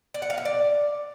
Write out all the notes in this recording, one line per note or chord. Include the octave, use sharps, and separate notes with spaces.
D5
F#5
F5
E5
D5